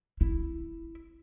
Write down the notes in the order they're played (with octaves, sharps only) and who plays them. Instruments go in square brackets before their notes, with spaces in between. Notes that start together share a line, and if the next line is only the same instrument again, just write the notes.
[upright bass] E4